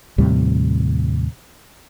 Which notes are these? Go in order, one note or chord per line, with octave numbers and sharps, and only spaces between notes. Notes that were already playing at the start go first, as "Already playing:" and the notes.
D#2 A2 C3 G3